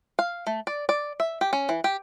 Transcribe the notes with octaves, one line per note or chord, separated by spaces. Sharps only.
F5
A3
D5
D5
E5
G4
C#4
E3
G4